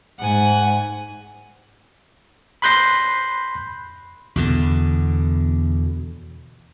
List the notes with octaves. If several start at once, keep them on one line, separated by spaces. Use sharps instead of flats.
G#2 F#5 G#5
B5 C6 F#6 G6 A#6 C7
E2 B2 D3